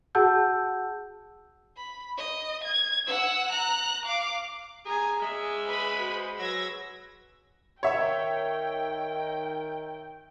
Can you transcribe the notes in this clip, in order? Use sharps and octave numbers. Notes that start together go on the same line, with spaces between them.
F#4 G#4 F#5 A5 E6 G6
B5
D#5
G#6
F#5 E6
A#5 F#6
F5 D6
G#4 G#5 A#5
G#3 E5
G#4 B4 B5
F#4 C5
F#3 G#4 B4 E6 G#6 A#6
D#3 C#5 E5 G5